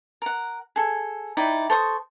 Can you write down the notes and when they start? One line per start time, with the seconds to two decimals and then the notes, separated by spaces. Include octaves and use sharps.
0.22 A#4 F#5
0.76 G#4 A4
1.37 D#4 E4 D5 G5
1.70 A4 C5 C#6 D#6